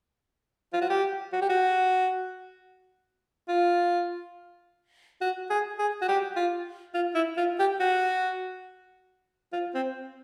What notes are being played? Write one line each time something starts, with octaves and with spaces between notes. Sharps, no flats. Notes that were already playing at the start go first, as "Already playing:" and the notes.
F4
F#4
G4
F#4
G4
F#4
F4
F#4
G#4
G#4
F#4
G4
F4
F4
E4
F4
G4
F#4
F4
C4